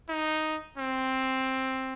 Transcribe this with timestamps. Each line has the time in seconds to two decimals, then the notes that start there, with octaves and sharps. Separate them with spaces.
0.10 D#4
0.78 C4